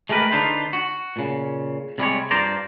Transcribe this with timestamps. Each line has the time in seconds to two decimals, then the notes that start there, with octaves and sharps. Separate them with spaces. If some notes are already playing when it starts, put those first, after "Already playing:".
0.09 G#3 A3 G4 A#4 B4
0.31 D3 D4 D#4 F4 B4 C5
0.73 F#4
1.16 A#2 C#3
1.98 C3 G3 G#3 C#5
2.31 G2 F4 C5 D5 A#5